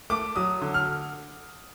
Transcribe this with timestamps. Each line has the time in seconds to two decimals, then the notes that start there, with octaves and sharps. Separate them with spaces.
0.10 A3 D6
0.36 F#3 D#6
0.62 D3
0.74 F6